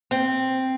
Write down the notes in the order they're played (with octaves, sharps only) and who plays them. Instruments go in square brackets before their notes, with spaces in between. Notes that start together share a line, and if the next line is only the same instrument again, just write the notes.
[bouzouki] C4